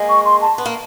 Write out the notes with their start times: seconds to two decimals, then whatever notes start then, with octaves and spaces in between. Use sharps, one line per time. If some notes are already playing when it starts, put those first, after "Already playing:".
Already playing: G#3 A#3
0.09 C#6
0.25 C6
0.41 A5
0.58 B3
0.66 A#3